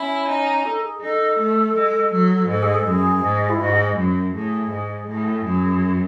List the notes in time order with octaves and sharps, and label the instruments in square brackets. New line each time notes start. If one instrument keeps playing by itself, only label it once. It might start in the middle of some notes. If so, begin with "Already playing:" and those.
Already playing: [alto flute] C#4 [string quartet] E4
[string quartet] D#4
[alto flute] A4
G#4
[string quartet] D#4 [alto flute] A4
[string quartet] A3
G#3
F#3
[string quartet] G#2 [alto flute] A4
[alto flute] G#4
A4
[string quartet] F#2 [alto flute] G#4
[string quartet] G#2
[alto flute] E4
[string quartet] G#2 [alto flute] F#4
[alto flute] G#4
[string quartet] F#2
[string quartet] A2 [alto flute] G#4
[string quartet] G#2
[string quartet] A2 [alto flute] G#4
[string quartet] F#2